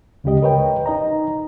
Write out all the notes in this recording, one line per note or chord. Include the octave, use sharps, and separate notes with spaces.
D2 C#3 G#3 G4 D#5
A#4 B4 C#5 D#5 G5
D#4 D#5 A#5